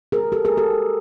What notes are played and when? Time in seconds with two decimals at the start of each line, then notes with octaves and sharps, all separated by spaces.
0.12 G#4 A#4
0.32 G4 A4
0.45 G#4 A#4
0.57 G4 A4